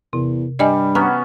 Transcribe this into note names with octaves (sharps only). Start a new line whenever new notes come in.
E2 C3
G2 G3 D5 D#5 G#5
B3 C#4 F#4 A#5